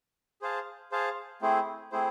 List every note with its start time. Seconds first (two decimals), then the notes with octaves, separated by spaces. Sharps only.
0.42 G#4 C5 F5 A5
0.92 G#4 C5 F5 A5
1.42 A3 C4 E4 G#4 C5
1.92 A3 C4 E4 G#4 C5